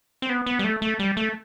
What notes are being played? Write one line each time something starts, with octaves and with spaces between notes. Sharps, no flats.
C4
B3
B3
G3
A3
A3
G3
A3